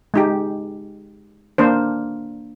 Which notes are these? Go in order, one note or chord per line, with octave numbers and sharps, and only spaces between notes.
G#3 D#4 G4
A#3 D4 C5